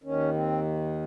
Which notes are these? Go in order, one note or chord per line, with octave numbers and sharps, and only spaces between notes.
D#2 D#3 C#4
C4